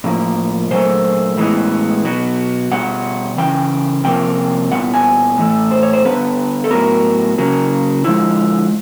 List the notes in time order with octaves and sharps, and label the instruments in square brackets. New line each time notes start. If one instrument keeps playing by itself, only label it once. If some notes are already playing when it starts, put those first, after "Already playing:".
[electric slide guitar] A2 F3 A#3
A#2 F#3 A3 C5
A2 E3 G#3 B3
B2 F#3 B3
B2 G3 F#5
C#3 E3 G5
C3 F3 A#3 G5
A#2 G3 B3 F#5
G#5
A2 E3 A3
C5
C#5
C5
D3 G3 B3 B4
A4
A2 F#3 B3 A#4
C#3 F#3 A#3
D3 F3 G#3 E4